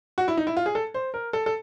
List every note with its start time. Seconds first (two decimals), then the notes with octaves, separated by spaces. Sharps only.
0.18 F#4
0.28 E4
0.37 D#4
0.47 E4
0.57 F4
0.66 G#4
0.75 A4
0.94 C5
1.14 A#4
1.33 A4
1.46 A4